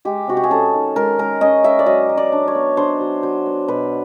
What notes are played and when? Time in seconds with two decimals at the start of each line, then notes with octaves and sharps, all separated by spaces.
0.05 G#3 G4
0.27 C3 F#4
0.37 G4
0.44 G#4
0.50 C#4 A4
0.74 D#3
0.96 G#3 A#4
1.18 G#3 A#4
1.41 C#4 D#5
1.64 C#4 E5
1.79 D5
1.86 F#3 D#5
2.09 F#3
2.17 D5
2.32 D4
2.48 C#5
2.55 B3
2.77 D4 C5
3.00 F#3
3.23 F#3 C5
3.46 B3
3.68 B2 B4